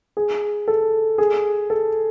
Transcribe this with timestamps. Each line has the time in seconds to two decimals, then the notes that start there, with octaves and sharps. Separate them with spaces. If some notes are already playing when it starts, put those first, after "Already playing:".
0.17 G#4
0.68 A4
1.18 G#4
1.70 A4